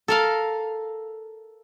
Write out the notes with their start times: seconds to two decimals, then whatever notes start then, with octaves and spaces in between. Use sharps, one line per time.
0.08 A4 A#4 F5